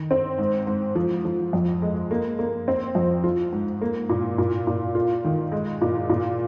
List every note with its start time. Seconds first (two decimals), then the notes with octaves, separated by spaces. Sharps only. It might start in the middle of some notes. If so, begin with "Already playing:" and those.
Already playing: D#3
0.11 C4
0.38 G#2
0.67 G#2
0.95 F3
1.25 F3
1.53 F2
1.82 G#3
2.11 A#3
2.39 A#3
2.68 C4
2.95 F2
3.24 F4
3.52 G#2
3.81 A#3
4.09 A#2
4.38 A#2
4.67 A#2
4.95 F4
5.24 D#3
5.52 G#3
5.81 A#2
6.09 A#2